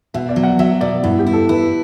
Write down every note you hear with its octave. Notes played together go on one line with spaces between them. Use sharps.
B2 E5
D5
F#3
F#5
F#3 E5
B2 D5
G2 E4
G4
E4
A4
E4 B4